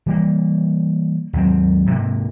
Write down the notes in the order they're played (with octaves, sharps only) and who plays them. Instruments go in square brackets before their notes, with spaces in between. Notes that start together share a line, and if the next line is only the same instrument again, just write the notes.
[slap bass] E3 G3 A#3
D#2 G#2 F#3 C4
G#2 C3 A#3